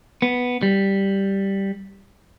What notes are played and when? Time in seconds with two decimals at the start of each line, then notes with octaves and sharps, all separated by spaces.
0.22 B3
0.63 G3